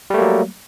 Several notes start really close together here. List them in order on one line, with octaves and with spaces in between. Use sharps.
G3 A3 A#3 F#3